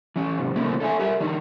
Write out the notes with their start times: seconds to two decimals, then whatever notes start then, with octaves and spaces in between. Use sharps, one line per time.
0.16 E3 C#4
0.38 G#2 C3
0.56 C3 D#3 A3 A#3 C#4 E4
0.80 A4 C#5 E5 G#5
1.00 G4 A#4 E5
1.20 D#3 D4 D#4